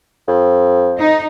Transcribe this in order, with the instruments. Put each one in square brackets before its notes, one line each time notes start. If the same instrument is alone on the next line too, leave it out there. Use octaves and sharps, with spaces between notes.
[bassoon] F2
[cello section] D#4